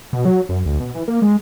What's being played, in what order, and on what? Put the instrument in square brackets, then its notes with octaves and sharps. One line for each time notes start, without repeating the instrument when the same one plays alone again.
[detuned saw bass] B2
F#3
F#2
D2
B2
E3
A#3
G#3